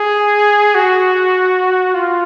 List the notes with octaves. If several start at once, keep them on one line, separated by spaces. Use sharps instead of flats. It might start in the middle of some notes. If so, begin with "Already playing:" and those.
Already playing: G#4
F#4
F4